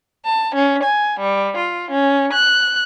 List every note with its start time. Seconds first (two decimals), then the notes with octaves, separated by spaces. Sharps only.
0.25 A5
0.54 C#4
0.84 G#5
1.19 G3
1.57 F4
1.91 C#4
2.33 F#6